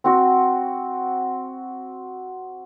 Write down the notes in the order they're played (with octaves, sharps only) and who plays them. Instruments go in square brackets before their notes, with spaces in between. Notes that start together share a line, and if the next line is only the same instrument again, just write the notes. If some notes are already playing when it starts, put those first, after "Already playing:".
[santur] C4 F#4